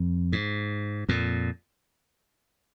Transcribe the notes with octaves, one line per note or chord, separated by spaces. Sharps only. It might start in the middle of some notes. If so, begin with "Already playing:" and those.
Already playing: F2
G#2
F2 A#2